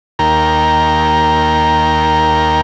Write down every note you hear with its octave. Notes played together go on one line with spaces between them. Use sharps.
D#2 A#3 A#4 G5